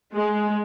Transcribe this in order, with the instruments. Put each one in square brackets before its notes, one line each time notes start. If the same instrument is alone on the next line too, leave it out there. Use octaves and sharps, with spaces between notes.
[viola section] G#3